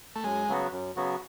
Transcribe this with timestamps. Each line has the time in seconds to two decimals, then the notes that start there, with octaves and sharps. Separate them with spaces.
0.16 A3
0.24 F#2 G#3
0.48 C#3 F#3 B3 F#4
0.72 F#2
0.96 C#3 F#3 B3 F#4